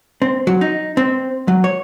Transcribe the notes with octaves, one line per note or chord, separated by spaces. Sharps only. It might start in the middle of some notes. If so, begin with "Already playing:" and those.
C4
F#3
D#4
C4
F#3
C#5